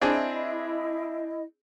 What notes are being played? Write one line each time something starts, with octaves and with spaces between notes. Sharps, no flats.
C4 D4 E4 G#4 D#5